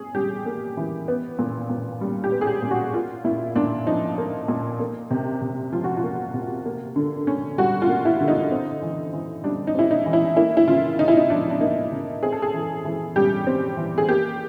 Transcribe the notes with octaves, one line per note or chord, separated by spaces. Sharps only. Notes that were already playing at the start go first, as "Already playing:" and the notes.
Already playing: C#4 G#4
G3 G4
A#3
E3
B3
A#2
A#2
G3
G4
B3
G#4
G4
A#2
F#4
A#3 F4
A#2 E4
A#2 D4
F3 D#4
A#3
A#2
A#3
C3
C3
F3 F4
F#4
F4
A#3
C3
A#3
D3
C#4
G3 F#4
F4
A#3
E4
D3
D#4
C4
E3
E3
G3 D4
D#4
C4 E4
D#4
E3
E4
A#3 E4
E4
C#3 F4
C#3 D#4
E4
D#4
F3 D4
D4
A#3 D#4
C#3
C4 G#4
A4
G#4
E3
E3
G3 G4
C4
E3
G#4
A#3 G4